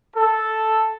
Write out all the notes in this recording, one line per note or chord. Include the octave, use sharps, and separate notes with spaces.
A4